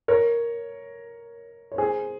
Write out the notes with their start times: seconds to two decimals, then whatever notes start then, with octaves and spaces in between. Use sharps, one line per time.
0.08 A#4 C#5
1.72 C#5
1.78 G#4 C5